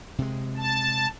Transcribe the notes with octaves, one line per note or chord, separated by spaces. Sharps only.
C3 G#3
A5